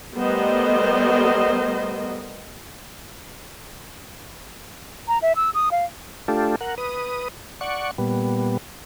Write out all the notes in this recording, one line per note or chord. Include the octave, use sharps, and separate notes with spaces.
G3 A3 B3 A#4 C5 D#5
A#5
E5
E6
D#6
F5
A3 D4 F4 G4 A4
A#4 F#5
B4 D#6
D5 F#5 C#6
A#2 G3 B3